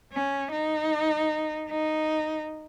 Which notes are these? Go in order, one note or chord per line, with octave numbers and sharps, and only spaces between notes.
C#4
D#4
D#4